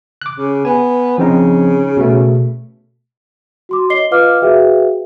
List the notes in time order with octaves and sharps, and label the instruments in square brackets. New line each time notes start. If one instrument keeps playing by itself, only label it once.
[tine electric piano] D6 F#6
[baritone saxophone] C#3
[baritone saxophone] B3 [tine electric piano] G#5
[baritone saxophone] C#3 [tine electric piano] F3 C4 D#4
[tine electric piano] B2 A3
[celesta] F#4 C6 D6
C#5 D#5 C7 G7
F4 B4 D#5 F5 D6 F6
F#4 G#4 B4 E5 F5 G5